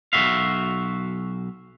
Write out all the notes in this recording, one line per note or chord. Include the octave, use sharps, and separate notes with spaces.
B1 G#2 F#4 E5 F5